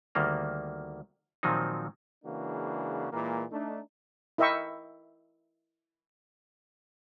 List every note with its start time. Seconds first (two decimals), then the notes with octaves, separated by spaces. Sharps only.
0.15 D2 D#3 G3 A#3 A#5
1.43 A#2 D#3 F3 F#3 C4 D#4
2.24 C#3 E3 G#3 A#3 D4 F#4
3.12 A#2 E3 G#3 A#3
3.50 A3 D4 D#4
4.38 E4 A#4 D#5 E5 G5 C#6